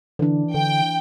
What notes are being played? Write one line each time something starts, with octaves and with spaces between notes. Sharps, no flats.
D3 E3 D4
D3 G5